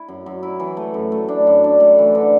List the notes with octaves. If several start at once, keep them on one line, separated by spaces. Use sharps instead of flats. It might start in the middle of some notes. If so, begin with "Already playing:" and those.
Already playing: E4
F#2
F#2
E4
E3
A3
F#2
A3
D4
F#2
D4
A3
E3
D3